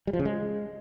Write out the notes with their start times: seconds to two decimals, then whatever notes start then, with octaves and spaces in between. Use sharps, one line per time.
0.07 G3
0.13 F3
0.19 C#3
0.25 G#3